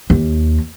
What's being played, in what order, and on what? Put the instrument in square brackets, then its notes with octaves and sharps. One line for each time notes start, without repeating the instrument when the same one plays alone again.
[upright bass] D#2